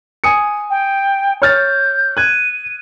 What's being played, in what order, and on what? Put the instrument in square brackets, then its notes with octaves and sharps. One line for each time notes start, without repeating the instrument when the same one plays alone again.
[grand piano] G#5 D#6 C#7
[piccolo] G5
[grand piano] C#5 F6 A6 [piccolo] G6
[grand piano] F#6 G#6 [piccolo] D#7